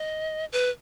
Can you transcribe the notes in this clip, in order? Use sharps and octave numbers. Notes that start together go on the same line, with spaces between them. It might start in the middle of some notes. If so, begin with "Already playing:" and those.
Already playing: D#5
B4